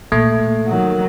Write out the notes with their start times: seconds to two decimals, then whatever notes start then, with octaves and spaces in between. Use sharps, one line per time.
0.12 A#2 A3
0.67 D#3 F#3